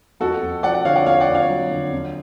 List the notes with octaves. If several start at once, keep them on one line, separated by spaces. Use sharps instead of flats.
F2 F#4 A4
F2
F3 D5 F#5
D5 F#5
D3 C#5 F5
D5 F#5
F2 C#5 F5
D5 F#5
F2
C#5 F5
F#3
D3
F2